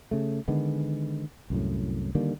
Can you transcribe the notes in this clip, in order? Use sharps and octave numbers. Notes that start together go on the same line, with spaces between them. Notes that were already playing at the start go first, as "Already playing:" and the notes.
C#3 A3
D3 D#3 G#3 B3
C2 F#2 A2
D3 D#3 G3 A#3